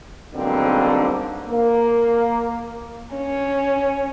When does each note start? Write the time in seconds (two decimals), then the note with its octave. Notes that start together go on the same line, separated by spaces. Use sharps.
0.34 B1 G#2 D3 G3 A#3 C4
1.48 A#3
3.15 C#4